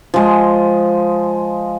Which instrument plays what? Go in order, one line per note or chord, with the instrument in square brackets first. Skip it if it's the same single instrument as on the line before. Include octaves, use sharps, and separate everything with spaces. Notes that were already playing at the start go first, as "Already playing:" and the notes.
[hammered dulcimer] F3 G#3